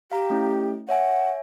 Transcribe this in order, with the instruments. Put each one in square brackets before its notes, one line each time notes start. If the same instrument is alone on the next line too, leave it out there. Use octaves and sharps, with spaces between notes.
[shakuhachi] G4 [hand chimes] F5 A#5
[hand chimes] A3 C#4 E4
[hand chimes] C#5 E5 G#5 [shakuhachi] F#5